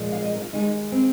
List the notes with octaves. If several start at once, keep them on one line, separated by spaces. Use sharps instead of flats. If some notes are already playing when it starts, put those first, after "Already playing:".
Already playing: A#2 F3 G#3
F5
D#5
A#4
F4
D#2 D#3 G#3 D#4
C4